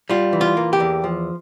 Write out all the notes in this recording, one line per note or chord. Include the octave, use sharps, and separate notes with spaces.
G3 F4
E3
F4
A#3
G4
E2
F3